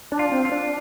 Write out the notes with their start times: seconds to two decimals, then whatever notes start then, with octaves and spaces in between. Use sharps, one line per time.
0.12 D4
0.19 F4
0.32 C4
0.45 F4
0.52 D4